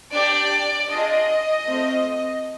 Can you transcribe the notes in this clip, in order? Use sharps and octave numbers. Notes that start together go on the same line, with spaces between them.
D4 G4 D5
D4 F4 G#4 D#5
A3 C4 F4